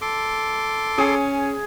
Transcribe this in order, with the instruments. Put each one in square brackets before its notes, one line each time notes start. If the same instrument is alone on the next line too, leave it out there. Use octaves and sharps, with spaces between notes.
[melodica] A4 C6 D6
[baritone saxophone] C#4 [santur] G#4